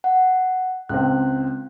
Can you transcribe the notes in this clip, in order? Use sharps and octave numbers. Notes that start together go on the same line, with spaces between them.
F#5
C#2 C4 F#6